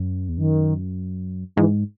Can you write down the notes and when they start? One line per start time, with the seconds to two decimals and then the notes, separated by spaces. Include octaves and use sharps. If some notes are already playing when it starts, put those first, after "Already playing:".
Already playing: F#2
0.29 E2
0.37 F#2 D#3
1.56 G#2 E3